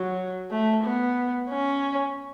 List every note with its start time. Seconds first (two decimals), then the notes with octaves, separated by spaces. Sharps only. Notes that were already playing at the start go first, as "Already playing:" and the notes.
Already playing: F#3
0.51 A3
0.84 B3
1.49 C#4